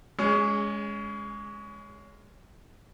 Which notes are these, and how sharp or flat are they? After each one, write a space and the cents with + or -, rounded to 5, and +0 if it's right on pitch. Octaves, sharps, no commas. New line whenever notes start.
G#3 +0 C#4 +25 G#4 -15